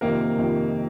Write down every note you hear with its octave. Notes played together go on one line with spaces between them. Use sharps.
F2 C3 D#3 A#3 A#4
F2 C3 D#3